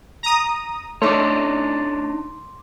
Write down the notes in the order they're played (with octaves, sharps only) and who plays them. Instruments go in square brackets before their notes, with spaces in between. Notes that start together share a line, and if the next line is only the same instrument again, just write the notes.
[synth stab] A#5 D#6
[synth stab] A3 [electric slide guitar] D4 D#4 C#5 [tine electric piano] C6 D6